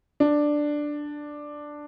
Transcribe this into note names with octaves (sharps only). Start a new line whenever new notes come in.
D4